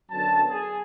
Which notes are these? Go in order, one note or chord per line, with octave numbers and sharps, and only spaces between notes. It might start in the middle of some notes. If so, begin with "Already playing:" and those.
F#2 D3 F#3 B3 A5
G#4